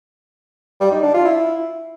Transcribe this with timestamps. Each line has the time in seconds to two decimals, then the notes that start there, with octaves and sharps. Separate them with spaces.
0.81 G3
0.92 D#4
1.03 D4
1.14 F4
1.25 E4